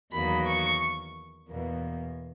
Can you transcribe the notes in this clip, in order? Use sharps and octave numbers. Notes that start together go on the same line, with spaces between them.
E2 D#3 F#3 A#3 B5
C#6
E2 B2 A#3